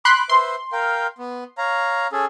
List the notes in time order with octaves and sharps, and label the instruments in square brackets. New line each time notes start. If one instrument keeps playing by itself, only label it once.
[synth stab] B5 C6 F#6 [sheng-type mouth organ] D6
[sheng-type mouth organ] B4 C5 E5 [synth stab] C6
[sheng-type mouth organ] A#4 F5 G5
B3
C#5 F5 A#5
C#4 G#4 A4